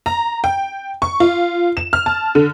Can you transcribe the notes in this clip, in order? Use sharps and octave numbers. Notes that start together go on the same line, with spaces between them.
A#5
G5
C#6
F4
E7
F6
A5
D3